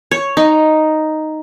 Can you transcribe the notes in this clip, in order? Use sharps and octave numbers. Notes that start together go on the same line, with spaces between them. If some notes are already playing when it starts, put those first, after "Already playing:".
C#5
D#4